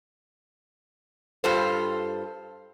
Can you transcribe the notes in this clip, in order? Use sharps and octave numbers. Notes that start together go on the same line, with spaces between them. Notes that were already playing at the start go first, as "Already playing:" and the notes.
G2 G3 F4 A4 C5